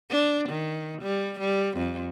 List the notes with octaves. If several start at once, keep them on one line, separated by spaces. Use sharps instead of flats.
D4
D#3
G3
G3
F2